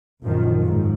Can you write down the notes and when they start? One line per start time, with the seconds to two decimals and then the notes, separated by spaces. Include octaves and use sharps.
0.21 A#1 F#2 D#3 F3
0.61 G#2